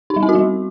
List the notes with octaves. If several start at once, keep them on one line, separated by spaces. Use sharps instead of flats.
D#4
G3
C4
F#4
G3